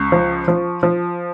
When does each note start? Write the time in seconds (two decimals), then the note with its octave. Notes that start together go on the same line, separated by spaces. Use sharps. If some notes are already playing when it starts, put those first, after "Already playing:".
Already playing: C#2 C#6
0.12 F3
0.48 F3
0.83 F3